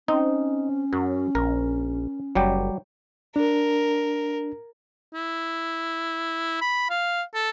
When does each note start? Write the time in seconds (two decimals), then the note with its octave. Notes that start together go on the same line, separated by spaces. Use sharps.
0.08 C4 C#4 D#4
0.93 F#2 F#3
1.35 A#1 A#4
2.35 F#1 F#3 G3 G4
3.36 D4 A#4
5.13 E4
6.61 B5
6.90 F5
7.34 A4